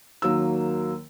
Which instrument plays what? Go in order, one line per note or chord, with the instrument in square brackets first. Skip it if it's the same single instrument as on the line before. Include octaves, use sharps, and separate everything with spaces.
[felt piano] D#2 F#3 A#3 A#4 E6